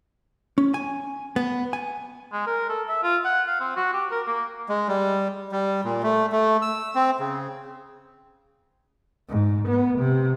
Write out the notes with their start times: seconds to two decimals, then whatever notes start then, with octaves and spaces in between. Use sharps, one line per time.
0.58 C#4
0.74 G#5
1.36 B3
1.73 G#5
2.32 G#3
2.47 A#4
2.69 A4
2.89 E5
3.03 F4
3.25 F#5
3.47 F5
3.60 C4
3.76 F#4
3.93 G4
4.11 A#4
4.27 A#3
4.69 G#3
4.88 G3
5.52 G3
5.84 A#2
6.03 A3
6.32 A3
6.62 E6
6.95 C4
7.20 C#3
9.29 G#2
9.69 B3
9.99 C3